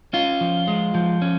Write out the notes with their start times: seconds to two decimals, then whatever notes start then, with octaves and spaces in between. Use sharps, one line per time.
0.13 C#4 F4
0.41 F3
0.68 G#3
0.95 F3
1.22 C#4